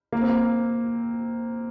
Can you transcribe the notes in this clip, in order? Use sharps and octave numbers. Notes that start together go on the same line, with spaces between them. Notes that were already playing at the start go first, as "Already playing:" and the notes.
A#3
C4
A#3